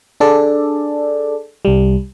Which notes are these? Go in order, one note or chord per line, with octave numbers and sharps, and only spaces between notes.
D4 G#4 A4 D5
C2 G3